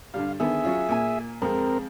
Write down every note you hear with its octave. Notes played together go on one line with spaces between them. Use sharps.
G2 D3 G3 F5
D3 D#3 B3 G#4 E5
F#3 C#4 F4
A#2 A#3 G#5
F2 G#3 C4 A#4